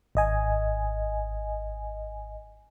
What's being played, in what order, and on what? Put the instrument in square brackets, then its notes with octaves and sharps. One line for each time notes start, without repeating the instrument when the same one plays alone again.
[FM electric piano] G#1 D#5 G#5